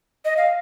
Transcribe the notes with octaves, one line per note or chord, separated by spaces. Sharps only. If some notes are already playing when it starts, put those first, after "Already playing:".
D#5
F5